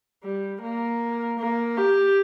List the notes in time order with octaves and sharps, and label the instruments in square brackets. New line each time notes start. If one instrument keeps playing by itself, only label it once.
[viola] G3
A#3
A#3
G4